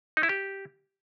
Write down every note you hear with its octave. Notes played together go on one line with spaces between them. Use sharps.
D#4
E4
G4